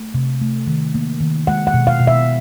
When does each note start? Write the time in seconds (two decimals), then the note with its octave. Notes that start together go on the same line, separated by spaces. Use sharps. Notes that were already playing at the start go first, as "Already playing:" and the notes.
Already playing: A3
0.14 C3
0.41 A3
0.67 D#3
0.95 A#3
1.20 D#3
1.47 G#3 F#5
1.67 F#5
1.74 B2
1.87 F5
2.00 B2
2.07 E5